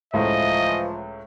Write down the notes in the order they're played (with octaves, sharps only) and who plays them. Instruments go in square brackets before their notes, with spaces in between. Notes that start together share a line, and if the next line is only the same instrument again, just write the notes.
[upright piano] C#2 A2 [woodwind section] E3 F3 [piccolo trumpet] D#5